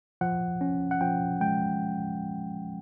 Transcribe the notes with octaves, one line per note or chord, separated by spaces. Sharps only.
F3 F#5
C#4
F#5
F3 G5
G#3 G5